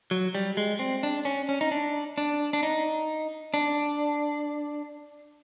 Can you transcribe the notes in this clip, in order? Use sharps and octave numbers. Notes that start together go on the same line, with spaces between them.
F#3
G3
G#3
C4
D4
C#4
C#4
D#4
D4
D4
D4
D#4
D4